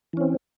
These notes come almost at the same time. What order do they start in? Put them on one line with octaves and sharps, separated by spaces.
E3 C#4 C4